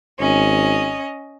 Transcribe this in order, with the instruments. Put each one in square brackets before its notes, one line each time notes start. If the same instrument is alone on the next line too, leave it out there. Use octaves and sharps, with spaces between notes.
[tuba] G#1 [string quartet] C#4 D#5